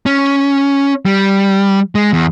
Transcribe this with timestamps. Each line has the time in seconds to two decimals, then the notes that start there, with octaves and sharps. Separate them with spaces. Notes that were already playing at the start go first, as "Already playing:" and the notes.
0.06 C#4
1.06 G3
1.95 G#3
2.13 E2